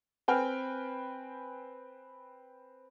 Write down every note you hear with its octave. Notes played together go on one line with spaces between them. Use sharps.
C4 B4 G5 G#5 F6